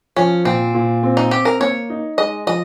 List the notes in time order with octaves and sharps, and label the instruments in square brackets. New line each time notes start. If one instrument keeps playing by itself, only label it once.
[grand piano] F3 [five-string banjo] C#4
[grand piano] A#2 [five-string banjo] C4
[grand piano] A#2
C4
[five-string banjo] D#4
[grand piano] C4 [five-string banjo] G4
[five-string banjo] A#4
[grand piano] A#3 [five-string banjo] C#5
[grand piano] D#4
[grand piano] G#3 [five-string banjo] D#5
[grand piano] F3 [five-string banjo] D#5